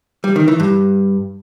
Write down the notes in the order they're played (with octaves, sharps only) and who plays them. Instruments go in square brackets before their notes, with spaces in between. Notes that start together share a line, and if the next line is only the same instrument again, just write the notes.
[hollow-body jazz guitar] G3
D#3
E3
G2